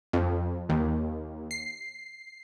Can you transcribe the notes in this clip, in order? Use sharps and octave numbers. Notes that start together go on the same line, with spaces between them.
F2
D#2
C7